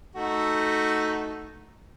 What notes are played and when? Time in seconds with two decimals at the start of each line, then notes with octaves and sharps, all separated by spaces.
0.16 A3 D#4 F#4